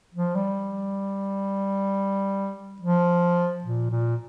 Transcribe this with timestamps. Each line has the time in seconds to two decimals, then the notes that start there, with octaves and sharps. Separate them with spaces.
0.14 F3
0.35 G3
2.82 F3
3.64 A#2
3.91 A#2